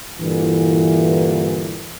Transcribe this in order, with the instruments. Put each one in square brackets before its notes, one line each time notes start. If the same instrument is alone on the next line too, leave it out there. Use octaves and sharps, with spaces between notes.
[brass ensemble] G2 A#2 D3 E3